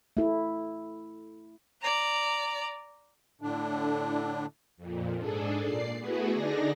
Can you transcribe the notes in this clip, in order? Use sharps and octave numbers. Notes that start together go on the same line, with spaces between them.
A3 E4
D5 A#5
A2 D3 D4
F2 A#2
G#2 D4 G#4 A4
A#2 D5 C7
A3 B3 E4 F#4 G#4 B4
D3 D4 D#4 G#4 D5 A#6